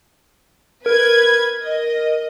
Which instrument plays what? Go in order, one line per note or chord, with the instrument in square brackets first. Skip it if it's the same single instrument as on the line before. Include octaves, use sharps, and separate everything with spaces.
[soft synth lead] A#4 [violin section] B4 G#6
[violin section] D#5